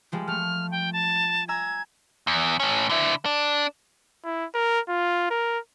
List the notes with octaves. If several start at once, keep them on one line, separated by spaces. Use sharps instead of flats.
F3 G3 G#3
A3 F6
G5
A5
G#5 A#5 E6 G#6
E2
A2 C#4
D3 E4
D4
E4
A#4
F4
A#4